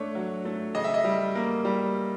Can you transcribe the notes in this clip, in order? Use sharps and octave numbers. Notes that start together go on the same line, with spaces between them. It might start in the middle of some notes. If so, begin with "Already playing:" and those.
Already playing: A3 D4 C#5
F#3
A3
C#3 D#5
E5
D#5
G3
A#3
G3